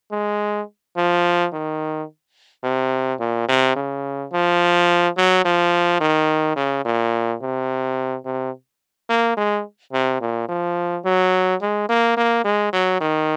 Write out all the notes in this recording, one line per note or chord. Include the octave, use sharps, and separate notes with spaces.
G#3
F3
D#3
C3
A#2
C3
C#3
F3
F#3
F3
D#3
C#3
A#2
C3
C3
A#3
G#3
C3
A#2
F3
F#3
G#3
A#3
A#3
G#3
F#3
D#3